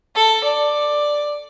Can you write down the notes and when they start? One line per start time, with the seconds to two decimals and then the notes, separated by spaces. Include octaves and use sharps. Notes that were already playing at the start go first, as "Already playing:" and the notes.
0.15 A4
0.44 D5